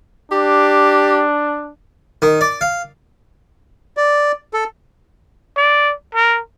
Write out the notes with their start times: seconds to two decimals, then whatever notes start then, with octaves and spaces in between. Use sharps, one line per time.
0.32 D4 G4
2.22 D#3
2.41 D5
2.61 F5
3.97 D5
4.53 A4
5.57 D5
6.15 A#4